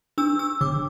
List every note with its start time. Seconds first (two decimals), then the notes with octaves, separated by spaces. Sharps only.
0.18 D4 E6
0.39 E6
0.61 D3 D6